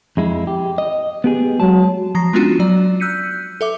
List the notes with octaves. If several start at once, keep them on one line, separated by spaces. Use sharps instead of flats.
F2 G#3 E4
G4
D#5
B3 G4 G#4
F#3 G#3 A5
F3 A#5 A#6 C7
G#3 B3 C#4 D4 F4 F#4
F#3 D5
E6 F#6 G6 B6 C#7 D#7
A4 E5 D6